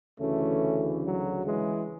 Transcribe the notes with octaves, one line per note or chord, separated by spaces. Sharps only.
D2 C#3 E3 A3 C#4
F#3
E3 G#3